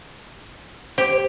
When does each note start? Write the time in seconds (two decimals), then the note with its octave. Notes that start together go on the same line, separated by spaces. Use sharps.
0.98 G4 C5